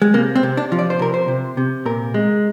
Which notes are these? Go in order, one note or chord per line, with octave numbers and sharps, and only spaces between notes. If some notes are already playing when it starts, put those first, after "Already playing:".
G#3
C3 A#3
C4
C3
D4
F3
D5
C5
C3 A#4
C5
C3
C3
A#2 A#4
G#3